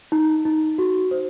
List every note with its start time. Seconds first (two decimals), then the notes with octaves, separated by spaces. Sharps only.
0.12 D#4
0.45 D#4
0.78 F#4
1.11 C5